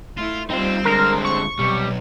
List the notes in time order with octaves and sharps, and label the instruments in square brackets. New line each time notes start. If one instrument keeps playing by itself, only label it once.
[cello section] A3 E4 [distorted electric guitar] F4
[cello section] G3 C5 [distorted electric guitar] C4 [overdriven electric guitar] D#4 F4
[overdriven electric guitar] D3 G#3 [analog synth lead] A#4
[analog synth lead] C#6
[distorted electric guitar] B1 [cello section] C3 [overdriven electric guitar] G3